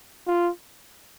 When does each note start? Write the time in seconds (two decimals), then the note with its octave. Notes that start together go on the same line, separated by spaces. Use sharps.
0.27 F4